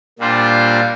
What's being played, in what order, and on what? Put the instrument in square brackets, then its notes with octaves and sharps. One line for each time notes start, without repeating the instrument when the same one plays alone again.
[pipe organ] A#2 G3 D4 F4 C5